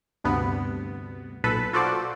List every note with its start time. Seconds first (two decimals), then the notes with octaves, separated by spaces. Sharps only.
0.24 D2 G2 C3 B3
1.44 B1 A#2 A4 B4 B5
1.73 F4 F#4 A4 C5 D5